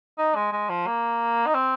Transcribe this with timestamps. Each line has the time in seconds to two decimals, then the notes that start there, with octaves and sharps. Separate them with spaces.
0.19 D#4
0.36 G#3
0.53 G#3
0.69 F3
0.87 A#3
1.47 D#4
1.55 C4